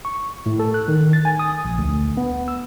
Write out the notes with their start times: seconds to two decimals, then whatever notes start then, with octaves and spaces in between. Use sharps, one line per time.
0.05 C#6
0.46 A2
0.59 A4
0.74 F#6
0.88 D#3
1.13 A6
1.25 G#5
1.39 D#6
1.65 A#1
1.78 D2
2.17 B3
2.48 E6